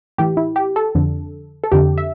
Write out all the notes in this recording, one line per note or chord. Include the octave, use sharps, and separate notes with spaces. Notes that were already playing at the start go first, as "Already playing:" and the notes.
A2 E3 G4
E4
G4
A4
F2 D3
A4
F2 D3 G4
E5